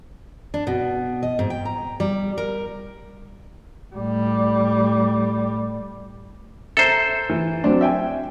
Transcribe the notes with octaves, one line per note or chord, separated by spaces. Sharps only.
D4
B2
D#5
G#2
G5
A#5
G3
A#4
A2 G3
A4 C5 E5 A#5
E3
F#3 C4 D4
E5 G5 G#5